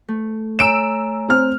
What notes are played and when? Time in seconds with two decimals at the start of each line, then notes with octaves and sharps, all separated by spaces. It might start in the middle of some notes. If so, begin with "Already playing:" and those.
0.08 A3
0.59 C#5 G#5 A#5 E6 D7 E7
1.28 C4 F6